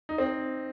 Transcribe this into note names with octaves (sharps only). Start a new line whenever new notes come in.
D#4
C4